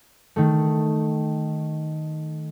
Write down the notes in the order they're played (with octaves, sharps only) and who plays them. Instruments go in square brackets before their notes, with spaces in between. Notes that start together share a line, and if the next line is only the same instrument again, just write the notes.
[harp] D#3 A3